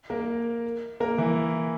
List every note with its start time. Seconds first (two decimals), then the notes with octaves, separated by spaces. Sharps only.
0.10 A#3 A#4
1.00 A#3 A#4
1.18 E3 E4